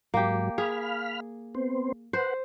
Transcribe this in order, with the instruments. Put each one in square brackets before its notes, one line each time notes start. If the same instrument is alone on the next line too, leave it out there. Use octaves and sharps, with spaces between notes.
[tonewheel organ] G#2 F#3 [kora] A#3 G4
[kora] G#4 [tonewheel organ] F5 B5 F6
[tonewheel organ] B3 C4 C5
[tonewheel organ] B4 F#5 [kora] C5